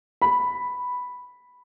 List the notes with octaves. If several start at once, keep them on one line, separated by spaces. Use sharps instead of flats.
B5